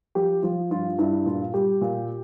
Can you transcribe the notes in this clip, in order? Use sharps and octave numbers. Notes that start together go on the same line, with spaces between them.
F3 G4
F3 F4
G2 F4
G2 E4
A#2 F4
G3 G4
A#2